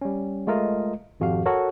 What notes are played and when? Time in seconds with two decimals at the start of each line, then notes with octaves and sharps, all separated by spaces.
0.02 G3 C#4
0.47 G#3 A3 F4 A#4 D#5
1.20 G#1 F2 F#4 G4 F5
1.46 F#4 A4 A#4 C#5